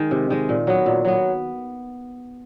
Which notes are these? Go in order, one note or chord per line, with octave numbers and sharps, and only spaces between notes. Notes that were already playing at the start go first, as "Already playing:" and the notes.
Already playing: D#3 G#3
C3
D#3 G#3
A#2
F#3 B3
A#2
F#3 B3